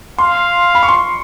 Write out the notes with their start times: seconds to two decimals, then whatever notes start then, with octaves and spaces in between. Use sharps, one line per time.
0.19 F5 C6
0.75 B5
0.83 C#6
0.89 C6